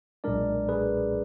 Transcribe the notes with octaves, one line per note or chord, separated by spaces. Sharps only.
B1 A#2 G#3 D4 A#4 D5
G#4 B4